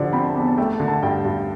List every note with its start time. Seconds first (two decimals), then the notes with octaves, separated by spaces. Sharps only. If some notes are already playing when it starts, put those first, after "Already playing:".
Already playing: D3 F3 G4 D5
0.13 C4 B5
0.24 A5
0.35 E2 A5
0.47 A5
0.58 A3 G5
0.72 A5
0.80 D3
0.88 A5
1.03 G2 G5
1.25 G2